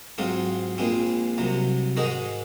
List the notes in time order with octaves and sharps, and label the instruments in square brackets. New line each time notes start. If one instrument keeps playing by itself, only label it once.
[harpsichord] G#2 F#3 C4 F4
A#1 A#2 G#3 C4
C2 C3 F#3
G#2 D#3 G#3 D#4 F#4